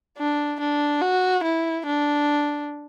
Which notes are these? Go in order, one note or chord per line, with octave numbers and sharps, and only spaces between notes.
D4
D4
F#4
E4
D4